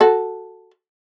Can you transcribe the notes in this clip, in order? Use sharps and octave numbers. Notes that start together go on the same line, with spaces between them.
F#4 A4